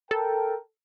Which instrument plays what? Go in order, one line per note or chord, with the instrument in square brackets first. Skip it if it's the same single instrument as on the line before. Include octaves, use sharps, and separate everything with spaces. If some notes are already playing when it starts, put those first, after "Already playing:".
[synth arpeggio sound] A4 [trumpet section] A#4 G5